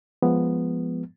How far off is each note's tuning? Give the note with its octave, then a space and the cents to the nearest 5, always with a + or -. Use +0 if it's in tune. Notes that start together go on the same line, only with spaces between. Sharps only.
F3 +0 G#3 +0 B3 +0